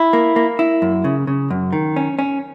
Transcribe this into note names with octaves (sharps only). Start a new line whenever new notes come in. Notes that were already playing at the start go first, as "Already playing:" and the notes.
Already playing: E4
A#3
A#3
E4
F#2
C#3
C#3
F#2
D#3
C#4
C#4